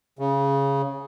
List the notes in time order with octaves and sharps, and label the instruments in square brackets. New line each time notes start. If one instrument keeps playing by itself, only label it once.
[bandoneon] C#3